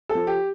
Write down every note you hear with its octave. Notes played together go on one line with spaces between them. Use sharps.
A4
F3
G4